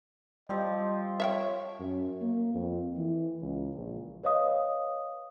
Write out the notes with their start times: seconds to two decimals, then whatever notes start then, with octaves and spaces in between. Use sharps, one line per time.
0.49 F3 G3 C4 G4 D#5
1.20 C#5 E5 F5 G5
1.80 F#2
2.21 A#3
2.55 F2
2.97 E3
3.41 C#2
3.74 A#1
4.23 B4 C#5 D#5 F5 D#6